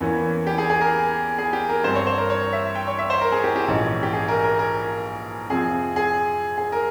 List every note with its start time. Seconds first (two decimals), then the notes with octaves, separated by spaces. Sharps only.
0.01 E2 E3 A#3 C#4
0.47 G4
0.58 G#4
0.70 G#4
0.81 A#4
1.38 G#4
1.53 G4
1.69 A#4
1.84 G2 G3 C4 C5
1.95 C#5
2.07 C5
2.18 A#4
2.30 C#5
2.53 E5
2.75 G5
2.87 C#5
2.98 E5
3.10 C5
3.21 A#4
3.32 G#4
3.44 G4
3.56 G4
3.68 A#1 G#2 E3 G#3 C#4
4.03 G4
4.13 G#4
4.28 A#4
4.44 A#4
4.59 A#4
5.50 F2 C3 F3 C4 G#4
5.96 G#4
6.58 G#4
6.72 A#4